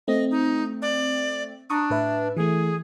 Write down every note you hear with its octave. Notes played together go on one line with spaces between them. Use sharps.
A3 C4 D#5
D#4
D5
D4 A#5 C#6 D#6
A2 B4 E5
E3 A3 G#4